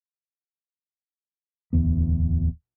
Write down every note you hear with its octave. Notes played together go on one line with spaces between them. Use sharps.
D1 E2 B3